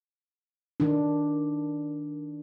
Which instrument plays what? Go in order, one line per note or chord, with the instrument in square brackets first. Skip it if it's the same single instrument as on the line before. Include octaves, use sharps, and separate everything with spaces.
[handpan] D#3 D4